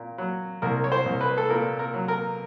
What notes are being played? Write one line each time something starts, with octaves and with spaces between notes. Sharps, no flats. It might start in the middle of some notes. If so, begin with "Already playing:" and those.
Already playing: A#2
F#3
C2 A#4
C#5
C5
C2
B4
A4
A#2 A#4
A#4
F#3
A#4